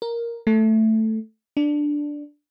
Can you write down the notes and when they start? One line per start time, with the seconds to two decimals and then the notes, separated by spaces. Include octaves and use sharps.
0.02 A#4
0.47 A3
1.57 D4